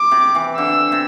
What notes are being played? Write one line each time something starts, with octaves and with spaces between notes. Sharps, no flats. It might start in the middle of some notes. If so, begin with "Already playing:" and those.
Already playing: D6
C3
E3
D3 E6
C3